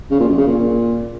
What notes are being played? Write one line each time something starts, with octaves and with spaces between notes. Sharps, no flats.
C#3
A#2
F#2
C#3
A#2